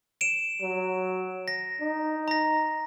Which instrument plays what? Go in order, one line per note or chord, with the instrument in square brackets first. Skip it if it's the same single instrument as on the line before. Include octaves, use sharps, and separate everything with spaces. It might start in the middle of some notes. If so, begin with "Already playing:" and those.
[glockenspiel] D7 E7
[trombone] F#3
[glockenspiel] A#6
[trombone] D#4
[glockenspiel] A#5 A#6